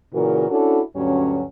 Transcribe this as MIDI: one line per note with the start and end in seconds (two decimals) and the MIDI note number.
0.14 0.46 46
0.14 0.46 49
0.14 0.46 52
0.14 0.46 58
0.14 0.46 66
0.14 0.46 70
0.50 0.80 61
0.50 0.80 62
0.50 0.80 64
0.50 0.80 66
0.50 0.80 69
0.96 1.42 38
0.96 1.42 43
0.96 1.42 54
0.96 1.42 61